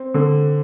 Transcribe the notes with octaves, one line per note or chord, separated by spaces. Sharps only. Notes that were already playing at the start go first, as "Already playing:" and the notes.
Already playing: C4
D3